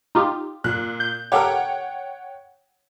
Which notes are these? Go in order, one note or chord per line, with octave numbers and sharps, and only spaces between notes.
D#4 F4 G4
A#2 F#6
G6
G4 A4 A#4 C#5 F#5 G5